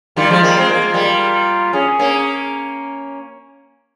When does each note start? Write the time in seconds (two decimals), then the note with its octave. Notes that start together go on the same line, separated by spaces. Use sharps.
0.17 D#3 G3 F4
0.30 F3 G#3
0.43 G3 A#3
0.57 G#3 C4
0.69 A#3 F4
0.82 G#3
0.94 G3 A#3
1.73 C#4 G#4
1.99 A#3 C#4